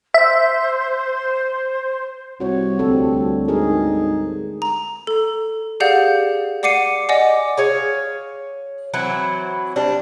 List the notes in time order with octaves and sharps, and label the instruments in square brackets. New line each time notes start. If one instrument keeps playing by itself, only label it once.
[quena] C5 [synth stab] E5
[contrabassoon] C2 [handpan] F#4 C#5
[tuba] D2 [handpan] G3 C4 A4
[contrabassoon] G#2 [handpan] G#4 A#4
[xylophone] A#5
A4
G4 G#4 D5 F5 F#5 G6
D5 F#5 D6 C7 C#7 D#7
D5 D#5 F#5 G#5 D6
[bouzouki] G#4 C#5 F5
E3 F#3 C4 E4
G3 C4 D4